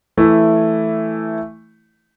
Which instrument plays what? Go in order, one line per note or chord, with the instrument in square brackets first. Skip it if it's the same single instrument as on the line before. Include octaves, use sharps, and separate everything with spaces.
[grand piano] E3 A3 E4